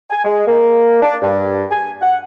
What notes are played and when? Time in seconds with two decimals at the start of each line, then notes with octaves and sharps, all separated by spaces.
0.10 G#5
0.24 G#3
0.47 A#3
1.02 D4
1.22 G2
1.71 G#5
2.02 F#5